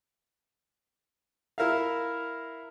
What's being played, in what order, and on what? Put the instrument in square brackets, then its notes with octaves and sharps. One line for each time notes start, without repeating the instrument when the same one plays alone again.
[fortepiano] E4 A#4 E5 F5